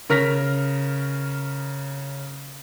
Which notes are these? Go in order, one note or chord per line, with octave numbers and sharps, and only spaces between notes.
C#3 A#4 F6 A#6 B6